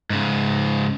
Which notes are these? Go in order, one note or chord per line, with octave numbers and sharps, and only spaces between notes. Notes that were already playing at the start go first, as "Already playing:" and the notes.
G#2 C#3